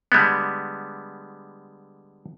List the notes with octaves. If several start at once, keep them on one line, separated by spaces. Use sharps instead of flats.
D3 G3 G#3 B3